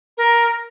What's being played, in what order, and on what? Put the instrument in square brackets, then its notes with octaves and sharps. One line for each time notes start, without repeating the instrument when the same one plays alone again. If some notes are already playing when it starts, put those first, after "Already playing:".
[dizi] A#4